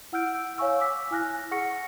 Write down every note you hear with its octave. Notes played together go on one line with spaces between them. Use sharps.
E4 F#5 E6 F6 G6 D7
C#5 F5 G#5 C#6 E6
D6 E6 B6
E4 G#5 F6 F#6 A#6
G#4 F#5 C#6 F6 A#6 C#7